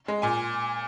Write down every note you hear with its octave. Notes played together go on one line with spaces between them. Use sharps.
G#3
A#2 G#5